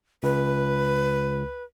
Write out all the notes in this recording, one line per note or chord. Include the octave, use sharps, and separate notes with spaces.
C#2 B4